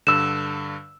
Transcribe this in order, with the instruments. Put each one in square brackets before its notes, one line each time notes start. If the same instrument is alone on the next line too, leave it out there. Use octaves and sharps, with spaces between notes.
[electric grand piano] G2 D3 [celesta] E6 E7